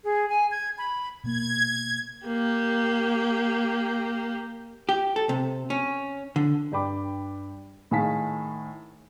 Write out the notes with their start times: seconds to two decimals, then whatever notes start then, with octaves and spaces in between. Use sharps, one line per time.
0.04 G#4
0.29 G#5
0.51 G#6
0.78 B5
1.24 B2 A#3 G#6
2.26 A#3 G4
4.89 G4
5.16 A4
5.29 C3
5.70 C#4
6.36 D3
6.72 G2 D4 G5 B5 D6
7.91 A2 D#3 G#4 F5 A5 B6